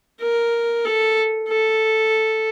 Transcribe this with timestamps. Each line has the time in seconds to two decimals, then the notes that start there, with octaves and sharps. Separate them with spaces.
0.21 A#4
0.85 A4
1.48 A4